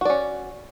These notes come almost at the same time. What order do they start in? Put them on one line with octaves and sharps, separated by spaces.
F#4 D5 C#4